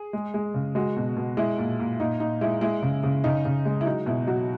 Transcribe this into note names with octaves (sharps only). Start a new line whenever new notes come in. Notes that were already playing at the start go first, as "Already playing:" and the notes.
Already playing: G#4
G#3
G#3
C#3
G#3 F#4
B2
B2
G#3 E4
A#2
A#2
A#2 D#4
A#2 D#4
G#3 E4
G#3 E4
C#3
C#3
C#3 D#4
C#3
G#3
E4
F#3 D#4
B2 E4
F#3 F#4